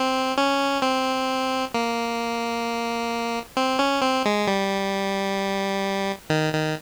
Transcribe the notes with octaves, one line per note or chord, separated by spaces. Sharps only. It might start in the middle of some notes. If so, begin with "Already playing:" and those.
Already playing: C4
C#4
C4
A#3
C4
C#4
C4
G#3
G3
D#3
D#3